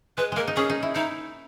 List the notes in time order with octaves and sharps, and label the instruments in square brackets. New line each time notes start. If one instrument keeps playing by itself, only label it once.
[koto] G#3 [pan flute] B4
[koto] G#3 A#3 [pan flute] A#4
[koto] D#4
[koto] C#4 [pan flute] G#4
[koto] D#4
E4
[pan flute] D#4 [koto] E4